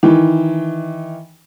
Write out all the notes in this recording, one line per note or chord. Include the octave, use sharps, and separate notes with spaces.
D#3 E3